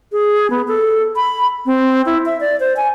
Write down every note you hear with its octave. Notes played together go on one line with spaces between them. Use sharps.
G#4
B3
A4
B5
C4
E4
E5
D5
C5
G#5